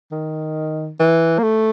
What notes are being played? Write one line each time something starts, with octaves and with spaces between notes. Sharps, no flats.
D#3
E3
A#3
A3